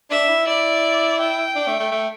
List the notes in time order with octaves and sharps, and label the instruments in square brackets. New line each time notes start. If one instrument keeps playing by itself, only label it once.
[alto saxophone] D4 [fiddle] E5
[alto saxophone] E4
[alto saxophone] E4 [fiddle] D5
[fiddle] G5
[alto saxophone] D4
A3
A3
A3